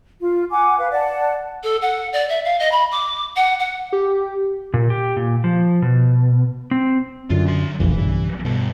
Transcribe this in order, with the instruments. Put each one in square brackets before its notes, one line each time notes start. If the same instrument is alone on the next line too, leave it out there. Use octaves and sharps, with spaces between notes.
[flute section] F4
F#5 G#5 D6
B4 F5
D5 F#5 A5
[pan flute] A4
F#5
D5
E5
F5
D#5
B5
D6
F#5
F#5
[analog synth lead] G4
[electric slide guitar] A#2
G4
A#2
F3
B2
C4
[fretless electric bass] F#2 D3 [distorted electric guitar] F4
[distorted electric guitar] F#3 C6
[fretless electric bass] E1 A#1 F2 [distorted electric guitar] E3
[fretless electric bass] B1 G2 C#3
[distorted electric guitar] G2 A4 [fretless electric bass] B2